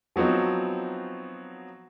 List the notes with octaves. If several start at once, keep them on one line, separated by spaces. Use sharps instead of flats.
F3 F#3 B3 C4 D#4